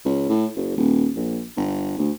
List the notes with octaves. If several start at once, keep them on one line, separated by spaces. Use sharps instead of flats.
C#2
A2
F#1
D#1
A#1
G1
D2